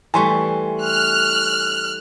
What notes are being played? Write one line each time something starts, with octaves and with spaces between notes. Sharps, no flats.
E3 G3 A3 G#5 C6 C#6
F6 F#6